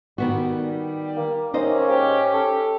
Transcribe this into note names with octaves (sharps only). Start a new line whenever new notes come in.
D#3 G3 B3 F#4
G3
A#3
C3 A#3 C#4 D#4 C5 D#5
G#2 G4
A4